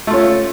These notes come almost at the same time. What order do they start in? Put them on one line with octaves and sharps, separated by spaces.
A3 F4 C#4